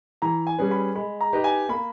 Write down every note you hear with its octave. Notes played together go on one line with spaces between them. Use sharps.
E3 A#5
G#5
G3 C#4 G#4 B4
B5
G#3 B5
A#5
D#4 G4 B4 D#5
G#5
A#3 B5